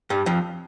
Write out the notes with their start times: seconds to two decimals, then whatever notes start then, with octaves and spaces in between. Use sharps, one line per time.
0.10 G2 G3
0.26 F2 F3